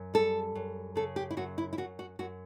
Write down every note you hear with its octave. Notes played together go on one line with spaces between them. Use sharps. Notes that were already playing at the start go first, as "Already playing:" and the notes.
Already playing: F#2
G3 A4
F#2
C#3 A4
G4
E4
F#2 F#4
E4
E4
F#2 F#4
F#4
F#2 F#4